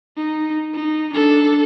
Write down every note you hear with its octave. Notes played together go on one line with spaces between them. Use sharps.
D#4
D#4
D4 A4